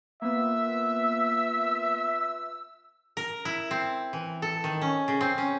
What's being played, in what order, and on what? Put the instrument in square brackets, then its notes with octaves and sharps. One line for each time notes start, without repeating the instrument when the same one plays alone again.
[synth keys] A#3 B3 [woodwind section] F4 B4 E6 [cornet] E5
[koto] A#4
E4
C4
E3
A4
D#3
C#4
C#3
C4
C#4